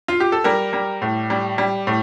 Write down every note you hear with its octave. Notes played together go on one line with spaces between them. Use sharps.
F4
G4
A4
G3 A#4
G3
A2
G3
G3
A2